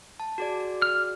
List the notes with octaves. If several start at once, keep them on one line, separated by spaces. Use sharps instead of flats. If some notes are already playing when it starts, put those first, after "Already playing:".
A5
F#4 G#4 D5
F6